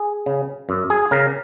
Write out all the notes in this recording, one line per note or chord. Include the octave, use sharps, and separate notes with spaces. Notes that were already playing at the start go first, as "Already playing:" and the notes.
Already playing: G#4
C#3
F#2
G#4
C#3 A#4